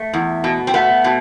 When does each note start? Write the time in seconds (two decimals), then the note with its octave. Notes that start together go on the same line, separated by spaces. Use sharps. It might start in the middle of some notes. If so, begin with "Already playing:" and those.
Already playing: A3
0.13 E2
0.44 B2
0.67 C4
0.74 A3 B3
1.04 B2